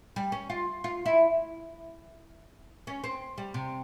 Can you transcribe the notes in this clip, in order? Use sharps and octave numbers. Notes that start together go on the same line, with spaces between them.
G3
C#4
F4
F4
E4
C#4
C4
G3
C3